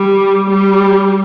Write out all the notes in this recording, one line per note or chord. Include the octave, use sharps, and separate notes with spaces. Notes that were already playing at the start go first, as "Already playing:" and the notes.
Already playing: G3
G3